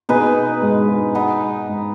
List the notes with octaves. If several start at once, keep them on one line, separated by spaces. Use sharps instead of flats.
B2 B3 D#4 G#4 B4 D#5
G#2 G#3
G#2 G#3
B3 D#4 B4
G#2